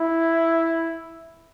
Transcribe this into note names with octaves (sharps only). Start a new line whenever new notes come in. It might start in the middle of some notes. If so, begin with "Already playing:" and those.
Already playing: E4